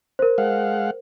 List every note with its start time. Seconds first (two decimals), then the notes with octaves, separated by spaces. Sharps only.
0.19 A#4 C5
0.38 G#3 F5 F#5